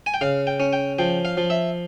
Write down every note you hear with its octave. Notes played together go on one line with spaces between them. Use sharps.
G#5
G5
C#3 F5
G5
C#4
G5
F3 G5
F5
F3
E5